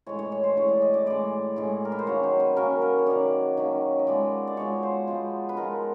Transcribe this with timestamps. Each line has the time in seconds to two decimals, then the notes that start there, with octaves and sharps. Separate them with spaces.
0.06 A2 E3 G#3 C#5
0.19 C#5
0.32 C#5
0.44 C5
0.57 A2 E3 G#3 C#5
0.69 D5
0.82 D#5
0.94 D5
1.06 A2 E3 G#3 D5
1.56 A2 E3 G#3
1.85 A#4
1.92 B4
1.99 C5
2.07 D#3 F#3 A#3 C#4 C#5
2.23 C5
2.40 B4
2.56 D#3 F#3 A#3 C#4 A#4
2.82 B4
2.99 C#5
3.06 D#3 F#3 A#3 C#4 D5
3.57 D#3 F#3 A#3 C#4
3.99 D#5
4.07 F3 G#3 B3 D5
4.47 D5
4.57 F3 G#3 B3 C#5
4.83 C5
5.07 F3 G#3 B3
5.49 B4
5.57 F3 G#3 B3 A#4